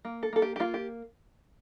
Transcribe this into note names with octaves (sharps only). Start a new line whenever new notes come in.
A#3
A4
A#3 A4
G4
G4
A#3 F4
G4